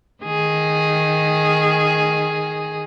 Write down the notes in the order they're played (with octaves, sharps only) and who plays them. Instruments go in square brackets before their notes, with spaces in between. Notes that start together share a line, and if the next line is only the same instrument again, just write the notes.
[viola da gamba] D#3 G#4